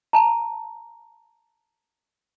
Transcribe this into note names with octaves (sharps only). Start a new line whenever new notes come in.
A5 A#5